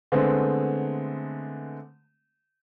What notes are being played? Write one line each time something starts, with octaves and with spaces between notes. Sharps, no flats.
D3 G#3 A3 B3 C4